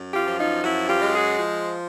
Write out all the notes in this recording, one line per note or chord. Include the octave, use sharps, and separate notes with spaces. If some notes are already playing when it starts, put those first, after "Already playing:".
Already playing: F#2
F4 G4
F3
D#4 F4
F#2 E4 F#4
F4 G4
G#3
F#4 G#4
F3